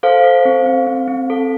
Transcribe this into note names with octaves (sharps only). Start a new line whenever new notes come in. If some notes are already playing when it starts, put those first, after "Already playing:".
A4 C5 F5
A4
C4
C4
C4
C4
A4